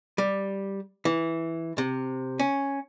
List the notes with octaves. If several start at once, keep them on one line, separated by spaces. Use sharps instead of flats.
G3
E3
C3
C#4